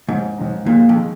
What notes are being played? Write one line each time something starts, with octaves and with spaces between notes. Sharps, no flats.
D#2 G#2 D#3 C4 D#4
D#2 D#3 C4 D#4
D#2 A#2 D#3 G#3
F2
D#3 G#3